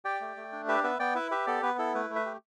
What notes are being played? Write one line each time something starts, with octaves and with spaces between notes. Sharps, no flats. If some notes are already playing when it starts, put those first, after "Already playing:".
G4 D5 G5
A3
A3
D4
G4 B4 E5
B3 B4 E5
B3 D5 G5
E4 B4 E5
G4 B4 E5
B3 A4 D5
B3 B4
E4 A4
A3 B4
A3
B4 E5
G4